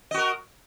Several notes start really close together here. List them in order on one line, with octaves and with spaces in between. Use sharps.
D#5 F#4 A#4